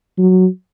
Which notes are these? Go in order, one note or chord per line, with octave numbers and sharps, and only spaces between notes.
F#3